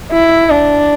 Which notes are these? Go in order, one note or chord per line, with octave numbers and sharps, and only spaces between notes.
E4
D4